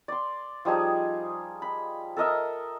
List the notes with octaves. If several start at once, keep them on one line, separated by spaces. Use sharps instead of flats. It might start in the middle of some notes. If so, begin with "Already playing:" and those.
D5 C6
F3 G3 D#4 G#4
B5
A4 A#4 D#5 E5